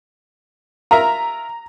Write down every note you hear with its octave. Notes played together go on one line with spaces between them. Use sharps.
F4 A#4 E5 A#5